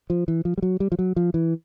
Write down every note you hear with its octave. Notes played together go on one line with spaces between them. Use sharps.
F3
E3
F3
G3
F#3
G3
F3
F#3
F3
E3